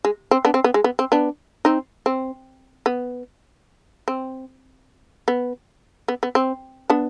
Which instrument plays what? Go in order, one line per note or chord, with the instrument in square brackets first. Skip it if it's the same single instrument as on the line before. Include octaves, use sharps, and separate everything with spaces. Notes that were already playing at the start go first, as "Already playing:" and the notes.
[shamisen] G#3
C4
B3 D4
C4
B3
G#3
B3
C4
B3 D4
C4 D#4
C4
B3
C4
B3
B3
B3
C4
B3 D4